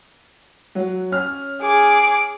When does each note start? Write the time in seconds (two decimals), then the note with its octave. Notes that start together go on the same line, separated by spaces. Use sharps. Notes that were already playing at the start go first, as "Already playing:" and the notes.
0.75 F#3
1.11 C#4 F6
1.61 G#4 D6